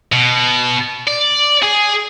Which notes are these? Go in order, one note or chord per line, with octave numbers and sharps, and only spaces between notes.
B2
D5
G#4